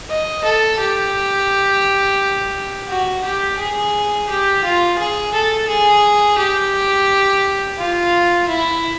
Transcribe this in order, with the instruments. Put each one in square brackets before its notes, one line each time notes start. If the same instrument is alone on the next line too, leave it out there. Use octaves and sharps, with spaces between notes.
[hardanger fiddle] D#5
A4
G4
F#4
G4
G#4
G4
F4
G#4
A4
G#4
G4
F4
E4